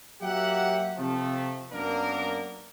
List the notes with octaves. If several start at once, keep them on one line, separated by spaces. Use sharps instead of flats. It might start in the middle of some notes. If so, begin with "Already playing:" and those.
F#3 A#3 G4 E5 F#5
C3 F3 A3
F#2 A#3 B3 D4 A#4